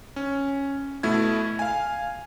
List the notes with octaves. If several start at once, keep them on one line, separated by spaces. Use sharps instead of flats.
C#4
B2 A3 E4 G#6
F5 G#5